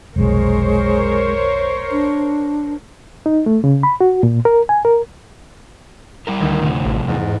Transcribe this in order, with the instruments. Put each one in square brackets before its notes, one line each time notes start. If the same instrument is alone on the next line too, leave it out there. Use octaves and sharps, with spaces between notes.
[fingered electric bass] F1 B1 [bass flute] G#3 [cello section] A#4 C5 C#5
[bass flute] D4
[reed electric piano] D#4
A3
C#3
B5
F#4
A#2
A#4
G#5
A#4
[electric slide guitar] G3 E4 A#4
[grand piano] D2 [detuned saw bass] D#3
[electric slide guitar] A2 C3 F3
[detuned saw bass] A1
[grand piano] E2 [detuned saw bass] G#2